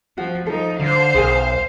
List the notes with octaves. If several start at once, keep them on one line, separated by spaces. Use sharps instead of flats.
F3 F#4
F3 D#4 A4
D3 C5 F5
B1 G#4 A#4 G#5